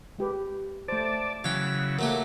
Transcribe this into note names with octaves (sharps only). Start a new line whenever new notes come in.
G#3 G4 B4
A3 C5 D5 A5
C#3 E3 F#3 F5 G5
F#3 A3 A#3 G4 A#4